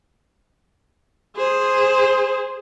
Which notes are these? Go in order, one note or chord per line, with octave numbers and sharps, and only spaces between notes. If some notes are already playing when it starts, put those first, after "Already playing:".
G#4 C5